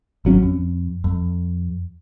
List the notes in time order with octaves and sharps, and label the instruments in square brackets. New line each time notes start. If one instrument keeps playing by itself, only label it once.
[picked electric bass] G#1 F#3 C#4
F2
F2